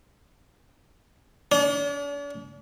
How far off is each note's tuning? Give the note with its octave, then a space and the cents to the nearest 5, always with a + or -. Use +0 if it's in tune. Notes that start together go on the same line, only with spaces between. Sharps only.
D4 -45